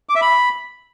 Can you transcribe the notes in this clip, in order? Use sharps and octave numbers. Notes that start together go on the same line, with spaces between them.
D6
E5
B5